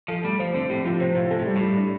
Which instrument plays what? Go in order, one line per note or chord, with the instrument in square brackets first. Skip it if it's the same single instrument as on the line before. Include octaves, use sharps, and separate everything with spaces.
[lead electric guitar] F3 [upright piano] A4
[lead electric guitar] G3 [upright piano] A3
[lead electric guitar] F3 [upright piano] C5
[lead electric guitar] D3 [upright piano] C4
[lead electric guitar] A2 [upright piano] G4
[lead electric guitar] A2 [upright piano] F3
[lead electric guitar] C3 [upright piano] C5
[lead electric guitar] A2 [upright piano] F4
[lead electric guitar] C3 [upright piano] A4
[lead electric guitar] A2
[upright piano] G3
[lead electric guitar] A2
[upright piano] G3
D4